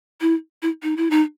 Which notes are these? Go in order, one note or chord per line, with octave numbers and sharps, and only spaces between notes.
E4
E4
D#4
E4
D#4